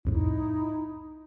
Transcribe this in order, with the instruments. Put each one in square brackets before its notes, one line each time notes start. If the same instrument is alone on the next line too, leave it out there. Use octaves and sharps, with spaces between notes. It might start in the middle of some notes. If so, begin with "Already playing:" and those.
[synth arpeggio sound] C2 F2 A2 [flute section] D#4 E4